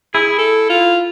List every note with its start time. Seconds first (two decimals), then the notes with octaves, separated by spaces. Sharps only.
0.14 E4 G#4
0.38 A4
0.69 F4